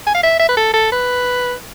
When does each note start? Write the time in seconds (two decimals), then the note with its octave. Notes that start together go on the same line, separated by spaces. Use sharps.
0.07 G#5
0.15 F5
0.23 E5
0.40 E5
0.49 B4
0.57 A4
0.74 A4
0.92 B4